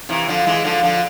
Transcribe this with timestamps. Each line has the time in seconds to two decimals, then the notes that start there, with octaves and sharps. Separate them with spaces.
0.09 C3 E3
0.28 D3 F3
0.47 E3 G#3
0.64 D3 F3
0.83 D3 F3